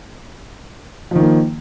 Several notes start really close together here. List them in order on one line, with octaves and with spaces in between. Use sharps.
F3 D#3 A#3